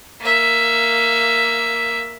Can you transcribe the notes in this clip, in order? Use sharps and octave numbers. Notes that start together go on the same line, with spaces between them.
A#3 E5